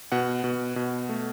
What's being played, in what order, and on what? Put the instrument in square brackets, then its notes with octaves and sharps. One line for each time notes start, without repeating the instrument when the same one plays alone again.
[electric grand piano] B2 F#5
B2
B2
A3